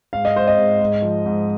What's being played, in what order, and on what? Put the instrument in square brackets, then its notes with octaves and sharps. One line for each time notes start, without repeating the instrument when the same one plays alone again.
[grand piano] G#2 F5
D#5
G#3 C5
D#5
G#2
G#2
F3
G#2